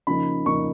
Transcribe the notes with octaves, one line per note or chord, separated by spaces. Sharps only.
C#3 F3 A#3 D#4 B5
C#3 F3 A#3 D#4 C#6